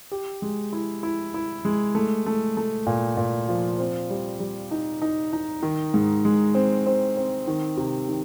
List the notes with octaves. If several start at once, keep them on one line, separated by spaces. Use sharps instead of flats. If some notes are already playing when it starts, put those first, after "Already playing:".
G4
G#3
E4
E4
E4
G#3
A3
A3
A3
A#2
A#2
F3
C4
G3
G3
D#4
D#4
D#4
D#3
G#2
G#3
C4
C4
C4
D#3
C3
D#3